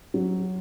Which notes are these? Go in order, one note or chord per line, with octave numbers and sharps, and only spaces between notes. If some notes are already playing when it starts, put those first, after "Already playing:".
F#3